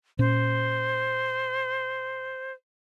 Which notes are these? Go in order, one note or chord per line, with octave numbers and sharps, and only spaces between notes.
A#2 C#4 C5